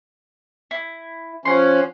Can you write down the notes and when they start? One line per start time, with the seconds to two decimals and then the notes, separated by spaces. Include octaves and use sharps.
0.71 E4
1.45 F3 C#4 F#5 C6